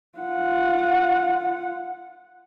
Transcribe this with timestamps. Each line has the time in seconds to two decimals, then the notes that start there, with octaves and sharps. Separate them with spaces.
0.18 F4 F#5